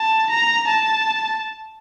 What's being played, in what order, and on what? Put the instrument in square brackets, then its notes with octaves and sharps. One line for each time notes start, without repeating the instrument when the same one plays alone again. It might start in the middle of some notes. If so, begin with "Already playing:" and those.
Already playing: [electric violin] A5
A#5
A5